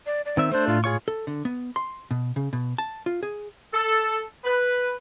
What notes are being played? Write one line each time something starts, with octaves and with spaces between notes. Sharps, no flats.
D5
D5
D#3 C4 E5
A3 D4 C5
A2 F4
F4 G#4 C#5 C#6
A4
D3
B3
C6
B2
C#3
B2
A5
F4
G#4
A4
B4